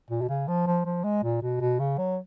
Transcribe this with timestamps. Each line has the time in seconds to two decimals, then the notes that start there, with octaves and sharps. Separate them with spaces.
0.10 A#2
0.21 B2
0.29 C#3
0.48 F3
0.67 F3
0.85 F3
1.04 G#3
1.23 A#2
1.42 B2
1.60 B2
1.79 C#3
1.98 F#3